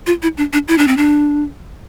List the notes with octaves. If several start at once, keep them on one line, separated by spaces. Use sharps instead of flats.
F4
E4
D4
D4
E4
D4
C4
D4